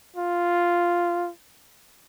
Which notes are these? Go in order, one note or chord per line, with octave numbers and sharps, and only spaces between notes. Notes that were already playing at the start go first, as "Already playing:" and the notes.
F4